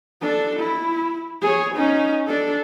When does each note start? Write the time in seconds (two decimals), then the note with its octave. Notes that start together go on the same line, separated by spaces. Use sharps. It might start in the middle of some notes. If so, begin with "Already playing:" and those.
0.22 D4 A4
0.60 E4
1.42 G#4 C#5
1.75 C#4 D#4
2.27 D4 A4